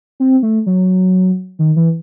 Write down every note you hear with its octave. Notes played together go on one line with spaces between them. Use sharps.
C4
A3
F#3
D#3
E3